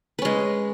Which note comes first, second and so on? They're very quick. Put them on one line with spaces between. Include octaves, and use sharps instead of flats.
B4 C#4 G#3